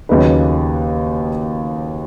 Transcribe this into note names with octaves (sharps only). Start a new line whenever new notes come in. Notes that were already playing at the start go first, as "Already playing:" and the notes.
D#2 C#3 F#3 D#4 B4